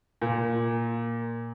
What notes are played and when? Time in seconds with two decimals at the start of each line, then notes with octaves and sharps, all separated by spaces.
0.22 A#2